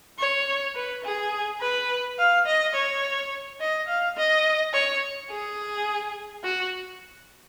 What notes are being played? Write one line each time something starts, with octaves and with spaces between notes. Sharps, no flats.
C#5
B4
G#4
B4
F5
D#5
C#5
D#5
F5
D#5
C#5
G#4
F#4